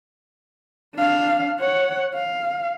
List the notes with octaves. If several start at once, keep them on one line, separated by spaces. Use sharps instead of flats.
D4 F5
C#5 F#5
F5